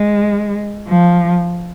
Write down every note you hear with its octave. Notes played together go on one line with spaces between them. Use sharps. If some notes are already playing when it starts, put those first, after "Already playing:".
Already playing: G#3
F3